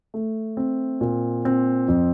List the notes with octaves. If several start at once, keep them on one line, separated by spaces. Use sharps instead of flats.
A3
C4
A#2
C4
F2